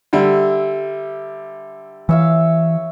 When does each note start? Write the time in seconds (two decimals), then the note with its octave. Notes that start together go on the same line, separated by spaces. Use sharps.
0.13 D3 G3 E5
2.09 E3 C#5 E5 F5